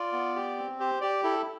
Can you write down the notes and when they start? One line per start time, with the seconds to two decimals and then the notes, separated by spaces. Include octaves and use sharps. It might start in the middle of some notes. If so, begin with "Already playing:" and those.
Already playing: F4 D5
0.13 B3
0.36 G4
0.58 C4
0.79 G4 C5
1.01 G4 D5
1.23 E4 A4